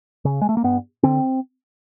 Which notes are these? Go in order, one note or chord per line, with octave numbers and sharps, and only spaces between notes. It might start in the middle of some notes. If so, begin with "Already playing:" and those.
C#3
G#3
A3
A#3
G2 B3
D3 C4